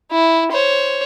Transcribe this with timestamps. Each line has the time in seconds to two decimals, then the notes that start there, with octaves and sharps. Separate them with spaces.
0.11 E4
0.52 C5 C#5